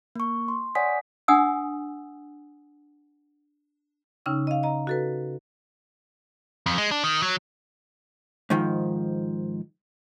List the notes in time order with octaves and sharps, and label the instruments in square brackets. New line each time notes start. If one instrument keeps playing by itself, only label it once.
[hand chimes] A#3 C#6
C6
C#5 D5 F#5 G#5 D#6 B6
[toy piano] D4 F#5 G#5 D#6 E6
[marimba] C#3 C#4 D#4 G5 E6
D#5 F5
D#5 A#5
F#4 A4 B4
[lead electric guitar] F2
G#3
D4
D#3
F#3
[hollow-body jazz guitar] G#2 D#3 F3